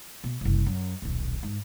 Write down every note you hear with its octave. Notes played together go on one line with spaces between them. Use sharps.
B2
F#1 C2
F#2
D#1 B1
G#2